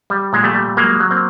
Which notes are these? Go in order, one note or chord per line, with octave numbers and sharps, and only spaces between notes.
G3
A#2 G#3
G3 A3
G3
F#3 G#3 A#3
F#3
A#3 C4